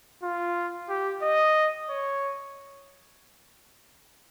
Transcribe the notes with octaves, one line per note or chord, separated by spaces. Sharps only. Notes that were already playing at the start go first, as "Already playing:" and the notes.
F4
G4
D#5
C#5